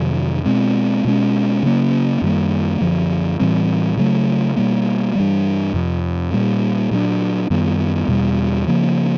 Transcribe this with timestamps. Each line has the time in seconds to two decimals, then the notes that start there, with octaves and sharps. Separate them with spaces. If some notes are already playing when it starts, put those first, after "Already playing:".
Already playing: F2 C3 D#3 F#3
0.45 B2 G#3 C4
1.05 B2 G#3 C#4
1.63 C#3 F#3 A#3 C#4
2.22 F#2 D#3 G3 A#3
2.81 F#2 D3 F3
3.40 A2 E3 G3 C4
3.97 C#3 F#3 A3
4.56 B2 G3 A#3
5.15 G2 E3 G3
5.74 F2 C3 F3
6.32 A#2 G3 A#3
6.91 A#2 F#3 B3 D4
7.50 F#2 D#3 G3 B3
8.08 E2 B2 G3
8.67 C#3 F3 A#3